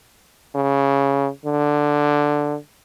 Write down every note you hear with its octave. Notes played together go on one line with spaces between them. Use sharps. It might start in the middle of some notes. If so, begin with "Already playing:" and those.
C#3
D3